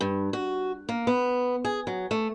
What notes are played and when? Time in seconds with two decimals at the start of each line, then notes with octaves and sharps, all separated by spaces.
0.01 G2
0.33 F#4
0.89 A#3
1.07 B3
1.65 G#4
1.87 F#3
2.11 A3